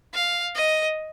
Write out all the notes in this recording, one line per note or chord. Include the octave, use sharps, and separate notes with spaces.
F5
D#5